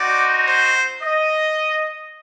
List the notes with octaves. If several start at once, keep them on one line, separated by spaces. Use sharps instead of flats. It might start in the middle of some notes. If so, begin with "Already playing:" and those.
Already playing: C4 D#4 F#4 D5
C5
D#5